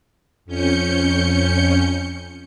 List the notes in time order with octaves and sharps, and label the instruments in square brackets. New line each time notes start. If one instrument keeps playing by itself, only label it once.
[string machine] F2 C#4 G6 C#7